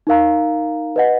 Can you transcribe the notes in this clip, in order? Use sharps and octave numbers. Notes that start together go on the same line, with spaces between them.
D#4 A#4 F5 A#5
B4 D#5 F#5